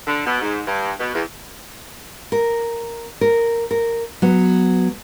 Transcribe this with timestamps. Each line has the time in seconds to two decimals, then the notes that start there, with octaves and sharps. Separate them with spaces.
0.07 D3
0.26 B2
0.42 G#2
0.67 G2
0.99 B2
1.13 E2
2.32 A#4
3.21 A#4
3.71 A#4
4.22 F#3 B3